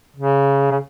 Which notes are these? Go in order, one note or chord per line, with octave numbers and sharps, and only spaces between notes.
C#3
C#3